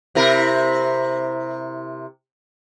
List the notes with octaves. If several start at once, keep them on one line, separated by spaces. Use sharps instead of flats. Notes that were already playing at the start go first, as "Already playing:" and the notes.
C3 E4 A#4